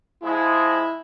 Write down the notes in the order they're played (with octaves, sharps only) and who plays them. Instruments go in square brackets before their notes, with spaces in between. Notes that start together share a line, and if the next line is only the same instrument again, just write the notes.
[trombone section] F3 G#3 [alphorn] E4